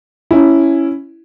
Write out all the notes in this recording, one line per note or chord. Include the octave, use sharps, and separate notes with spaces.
C#4 E4